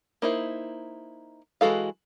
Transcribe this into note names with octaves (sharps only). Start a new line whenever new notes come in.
A#3 D#4 E4 C5
E3 G#3 F#4 A4 F5